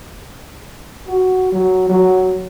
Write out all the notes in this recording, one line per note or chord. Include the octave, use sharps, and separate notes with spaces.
F#4
F#3
F#3